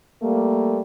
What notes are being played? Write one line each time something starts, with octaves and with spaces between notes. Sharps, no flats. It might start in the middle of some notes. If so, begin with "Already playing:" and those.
G3 A3 A#3